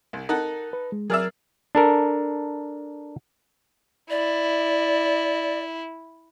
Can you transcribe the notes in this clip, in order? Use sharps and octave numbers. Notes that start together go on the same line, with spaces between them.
C2
D#4 A4 A#4 F#5
B4
G#3
F#3 G#4 A#4 D5 E5 F6
D4 A4 A#4
E4 D5